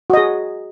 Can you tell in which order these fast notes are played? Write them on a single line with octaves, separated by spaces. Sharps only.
F#4 D#5 G#4